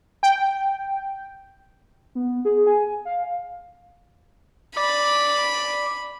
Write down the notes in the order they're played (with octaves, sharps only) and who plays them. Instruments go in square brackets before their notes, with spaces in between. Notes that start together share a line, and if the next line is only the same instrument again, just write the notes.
[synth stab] G5
[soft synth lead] B3
G#4
G#5
F5
[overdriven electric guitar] D5 [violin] B5